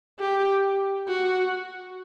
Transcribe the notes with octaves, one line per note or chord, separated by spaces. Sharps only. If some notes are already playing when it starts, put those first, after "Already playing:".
G4
F#4